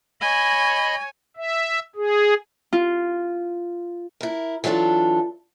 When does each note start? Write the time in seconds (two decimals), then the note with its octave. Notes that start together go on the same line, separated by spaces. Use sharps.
0.21 C#5 D#5 G#5 B5
1.37 E5
1.96 G#4
2.73 F4
4.21 E4 A#4
4.64 E3 F#3 D4 F4 A4